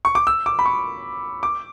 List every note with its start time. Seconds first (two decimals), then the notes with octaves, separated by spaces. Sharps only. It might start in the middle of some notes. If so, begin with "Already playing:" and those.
0.05 C#6
0.15 D6
0.27 E6
0.46 D6
0.59 B5
0.66 C#6
1.43 D6